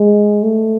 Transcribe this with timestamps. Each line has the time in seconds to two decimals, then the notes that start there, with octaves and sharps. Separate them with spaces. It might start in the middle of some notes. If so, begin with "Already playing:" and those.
Already playing: G#3
0.43 A3